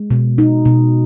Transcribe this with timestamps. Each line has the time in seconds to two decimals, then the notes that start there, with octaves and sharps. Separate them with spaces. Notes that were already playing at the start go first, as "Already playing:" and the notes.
Already playing: G#3
0.10 B2
0.38 D#4
0.65 B2